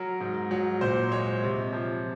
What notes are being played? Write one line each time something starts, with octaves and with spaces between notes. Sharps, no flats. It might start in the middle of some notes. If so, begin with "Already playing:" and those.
Already playing: F#3 A#4
G#2
F#3
A#2 C5
G#3 C#5
C3
F3